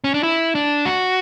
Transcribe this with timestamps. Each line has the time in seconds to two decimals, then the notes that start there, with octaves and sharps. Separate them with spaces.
0.04 C#4
0.14 D4
0.23 E4
0.55 D4
0.86 F#4